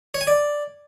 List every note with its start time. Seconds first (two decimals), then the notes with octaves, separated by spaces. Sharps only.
0.14 C#5
0.21 G#5
0.27 D5